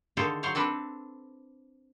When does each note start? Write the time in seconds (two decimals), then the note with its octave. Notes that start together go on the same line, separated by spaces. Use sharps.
0.17 D3 D#3 G#4 A4 C5 F5
0.43 F#3 C5 C#5 F5
0.55 C4 D4 A4 B4